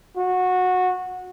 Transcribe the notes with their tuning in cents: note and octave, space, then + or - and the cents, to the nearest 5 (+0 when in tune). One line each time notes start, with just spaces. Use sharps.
F#4 -15